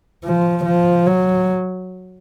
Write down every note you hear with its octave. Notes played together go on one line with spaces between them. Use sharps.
F3
F3
F#3